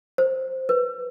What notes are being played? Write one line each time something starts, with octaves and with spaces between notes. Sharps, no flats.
C5
B4